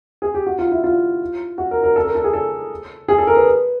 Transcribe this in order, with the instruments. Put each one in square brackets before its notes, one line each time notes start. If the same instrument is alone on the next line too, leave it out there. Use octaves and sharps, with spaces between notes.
[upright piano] G#4
G4
F#4
F4
E4
F4
F#4
A#4
A#4
A4
A#4
A4
G#4
A4
G#4
A4
A#4
B4